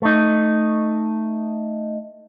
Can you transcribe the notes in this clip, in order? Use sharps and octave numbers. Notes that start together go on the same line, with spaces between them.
A3 D#4